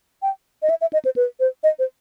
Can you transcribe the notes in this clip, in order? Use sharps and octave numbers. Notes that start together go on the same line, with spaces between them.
G5
D#5
E5
E5
D#5
C5
B4
C5
D#5
C5